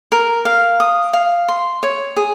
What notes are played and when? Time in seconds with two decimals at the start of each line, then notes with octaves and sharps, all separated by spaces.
0.12 A#4
0.45 F5
0.80 D#6
1.13 F5
1.48 C6
1.83 C#5
2.17 G#4